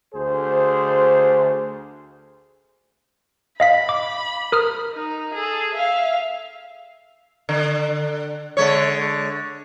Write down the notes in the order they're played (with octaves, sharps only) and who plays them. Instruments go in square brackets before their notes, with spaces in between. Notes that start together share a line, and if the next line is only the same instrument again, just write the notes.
[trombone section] D2 G#4 C5
[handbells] D#5 F5 B6 [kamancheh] B5
[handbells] D6
A#4 D#6 F6
[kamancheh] D#4
G#4 A4
E5 F5
[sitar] D3
D3 G#3 C#5